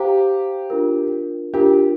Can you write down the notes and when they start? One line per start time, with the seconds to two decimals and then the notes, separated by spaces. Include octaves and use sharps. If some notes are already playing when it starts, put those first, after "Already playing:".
Already playing: G4 C5 F5 A#5 D6
0.70 D4 F4 A#4
1.54 D4 F4 G4 A#4